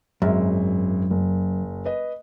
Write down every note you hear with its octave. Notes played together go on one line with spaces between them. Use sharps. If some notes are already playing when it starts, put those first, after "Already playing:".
G#1 F#2 G#3 E5
F#1
B4 D#5